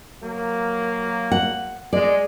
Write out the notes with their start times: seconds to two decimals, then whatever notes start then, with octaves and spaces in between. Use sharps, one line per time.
0.23 F#3 A#3
1.32 F#5
1.93 G#3 D5